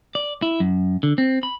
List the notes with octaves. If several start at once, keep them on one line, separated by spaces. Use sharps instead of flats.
D5
E4
F#2
D3
C4
B5